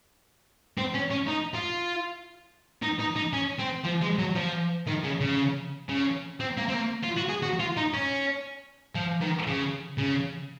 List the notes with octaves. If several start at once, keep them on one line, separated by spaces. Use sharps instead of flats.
C4
C#4
C#4
D#4
F4
D#4
D#4
D#4
C#4
C4
F3
G#3
F#3
F3
D#3
C#3
C#3
C#3
C4
A#3
C4
A#3
F4
F#4
G#4
F#4
F4
D#4
C#4
F3
D#3
C#3
C#3